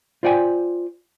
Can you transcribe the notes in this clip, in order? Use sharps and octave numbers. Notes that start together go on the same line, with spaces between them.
F4 C5 D5 G5 G#5